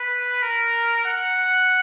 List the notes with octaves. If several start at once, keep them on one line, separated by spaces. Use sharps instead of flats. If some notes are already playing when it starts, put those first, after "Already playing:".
Already playing: B4
A#4
F#5